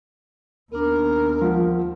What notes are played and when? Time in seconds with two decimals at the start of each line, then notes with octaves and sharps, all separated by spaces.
0.72 D#2 B3 D4 A#4
1.41 F3 F4 F#5